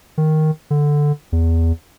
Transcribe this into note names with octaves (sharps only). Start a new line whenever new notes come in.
D#3
D3
E2